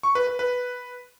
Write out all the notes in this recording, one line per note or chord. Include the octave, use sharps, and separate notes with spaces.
C#6
B4
B4
B4